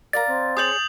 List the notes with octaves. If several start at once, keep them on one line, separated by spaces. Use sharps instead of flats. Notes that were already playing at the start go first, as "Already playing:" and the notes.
A#4 D5 F5 A#5 A6
C4
G#4 C#5 D#6 G6 F#7